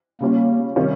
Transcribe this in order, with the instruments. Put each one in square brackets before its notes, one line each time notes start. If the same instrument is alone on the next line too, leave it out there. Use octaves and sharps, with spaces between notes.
[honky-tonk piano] C#3 G3 C#4 F4 [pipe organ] A#3
[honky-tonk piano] C3 D#3 G3 C#4 F4